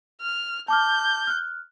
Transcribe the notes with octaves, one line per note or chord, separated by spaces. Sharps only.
F6
A5 D6 F6 G6
F6 F#6